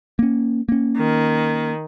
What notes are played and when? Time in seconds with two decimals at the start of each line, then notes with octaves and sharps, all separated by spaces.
0.19 A#3 C#4
0.69 A#3 C#4
0.97 D#3